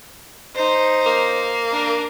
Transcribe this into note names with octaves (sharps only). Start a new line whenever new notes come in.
D#4 C5
A#3
D4 A#4